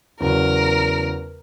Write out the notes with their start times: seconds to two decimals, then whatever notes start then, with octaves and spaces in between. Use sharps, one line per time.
0.20 E2 C#3 F#3 A#4